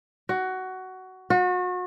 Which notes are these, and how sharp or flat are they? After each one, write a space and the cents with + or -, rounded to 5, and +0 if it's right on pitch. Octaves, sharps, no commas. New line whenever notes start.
F#4 +15
F#4 -35